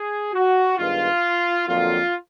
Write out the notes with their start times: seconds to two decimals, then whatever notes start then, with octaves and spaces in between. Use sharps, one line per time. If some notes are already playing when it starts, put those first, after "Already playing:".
Already playing: G#4
0.33 F#4
0.78 G2 D#3 G#3 B3 F4
1.67 F2 D3 F#3 A#3 F4